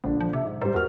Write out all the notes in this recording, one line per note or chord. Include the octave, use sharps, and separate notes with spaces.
A#1 A#2 D3 D4
F3
C3 E5
G#2
G#2 G3 C5
E2 F#4 A#4 F6